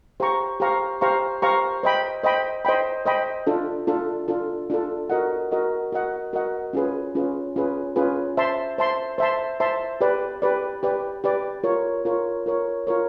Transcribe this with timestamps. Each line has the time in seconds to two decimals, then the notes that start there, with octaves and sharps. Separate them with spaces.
0.20 G4 C5 F5 A#5 C#6
0.60 G4 C5 F5 A#5 C#6
1.01 G4 C5 F5 A#5 C#6
1.42 G4 C5 F5 A#5 C#6
1.83 C5 D#5 G5 B5
2.23 C5 D#5 G5 B5
2.65 C5 D#5 G5 B5
3.06 C5 D#5 G5 B5
3.47 D4 F4 A4
3.87 D4 F4 A4
4.28 D4 F4 A4
4.70 D4 F4 A4
5.10 F#4 A#4 D#5 F#5
5.51 F#4 A#4 D#5 F#5
5.92 F#4 A#4 D#5 F#5
6.33 F#4 A#4 D#5 F#5
6.73 C#4 F4 G#4 B4
7.15 C#4 F4 G#4 B4
7.56 C#4 F4 G#4 B4
7.96 C#4 F4 G#4 B4
8.37 C5 E5 A5 C6
8.78 C5 E5 A5 C6
9.18 C5 E5 A5 C6
9.60 C5 E5 A5 C6
10.01 G4 B4 D5
10.42 G4 B4 D5
10.83 G4 B4 D5
11.24 G4 B4 D5
11.64 F4 A#4 C#5
12.05 F4 A#4 C#5
12.46 F4 A#4 C#5
12.87 F4 A#4 C#5